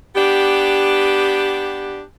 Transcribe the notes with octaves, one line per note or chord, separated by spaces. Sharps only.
B3 D4 G4